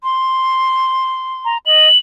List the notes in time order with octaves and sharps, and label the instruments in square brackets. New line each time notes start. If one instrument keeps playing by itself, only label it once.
[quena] C6
[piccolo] A#5
[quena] D#5 [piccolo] F#7